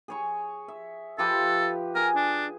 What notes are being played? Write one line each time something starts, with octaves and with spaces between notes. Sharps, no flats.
G#4 C#5 C#6
E5
F3 G4 A4 B4
G#4 A#4 G#5
D4